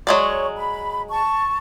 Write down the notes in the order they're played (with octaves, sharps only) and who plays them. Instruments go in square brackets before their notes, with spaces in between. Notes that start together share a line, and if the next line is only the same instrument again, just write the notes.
[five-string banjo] F#3 G#3 D5 [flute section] C#5 C#6
[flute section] B5
A5 C#6